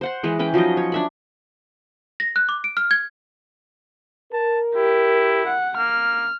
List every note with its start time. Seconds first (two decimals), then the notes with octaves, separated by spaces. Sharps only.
0.01 C5 F#5 C6
0.23 E3 G#3 B4
0.39 C#4 B4 G5
0.54 F3 F#3 D#4 D#5
0.77 C#5
0.92 D4 E5 B5
2.20 A#6
2.36 F#6
2.49 D6
2.64 D7
2.77 F6
2.91 G#6
4.33 A#4 A5
4.75 E4 G4
5.47 F#5
5.77 A#3 F6